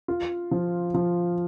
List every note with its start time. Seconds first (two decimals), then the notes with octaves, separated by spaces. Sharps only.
0.08 F4
0.51 F3
0.94 F3